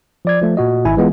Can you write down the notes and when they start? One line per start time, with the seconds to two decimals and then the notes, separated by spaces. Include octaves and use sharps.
0.25 F3 D5 G#6
0.41 F3 A3
0.57 A#2 F#4 D#5
0.85 G#1 E4 G#5
0.97 E3 G#3 B3 F4